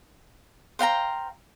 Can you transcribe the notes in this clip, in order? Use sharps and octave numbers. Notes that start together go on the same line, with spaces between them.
C5 F5 G5 A#5